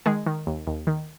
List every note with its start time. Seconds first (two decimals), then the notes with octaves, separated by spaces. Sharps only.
0.06 D#3 G#3 G#4
0.26 D#3
0.47 D#2
0.67 D#2
0.87 D#3